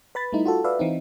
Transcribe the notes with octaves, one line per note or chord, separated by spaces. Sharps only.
B4 B5 A6
G3 A3 D#4 E4
F4 F#4 A4
F#4 B4 D5 E5 F5
E3 C4 D#4